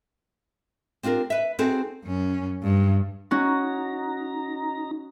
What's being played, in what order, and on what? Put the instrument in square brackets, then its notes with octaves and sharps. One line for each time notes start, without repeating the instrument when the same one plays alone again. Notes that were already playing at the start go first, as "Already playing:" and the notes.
[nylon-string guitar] C4 D4 F4 G4 A#4
B4 E5
C4 D#4 F#4 G#4 A4 C5
[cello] F#2 C#4
G2
[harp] C#4 F#4 [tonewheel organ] D#4 A#5